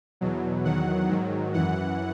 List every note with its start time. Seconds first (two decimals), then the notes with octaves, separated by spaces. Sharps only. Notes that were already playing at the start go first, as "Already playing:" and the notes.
0.21 E2 B2 F#3
0.65 E2 D#3 F#3 F#5
1.09 G#2 D#3 F#3
1.54 F#2 E3 F#5